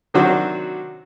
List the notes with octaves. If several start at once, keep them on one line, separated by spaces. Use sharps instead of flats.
C3 D#3 F#3 C4 D4 F#4